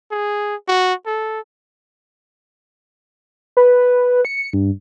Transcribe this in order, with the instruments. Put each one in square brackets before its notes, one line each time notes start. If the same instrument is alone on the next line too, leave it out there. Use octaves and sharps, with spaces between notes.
[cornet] G#4
F#4
A4
[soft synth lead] B4
C#7
G2